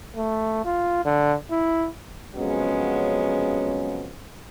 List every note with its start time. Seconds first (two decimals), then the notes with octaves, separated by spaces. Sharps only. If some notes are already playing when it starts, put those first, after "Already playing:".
0.16 A3
0.65 F4
1.05 D3
1.51 E4
2.36 F2 C#3 F#3 G#3 B3 C#4